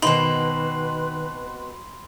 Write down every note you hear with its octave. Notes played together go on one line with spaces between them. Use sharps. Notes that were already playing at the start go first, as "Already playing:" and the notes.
B2 D#3 C4 D#4 B4 B5 C6 F#7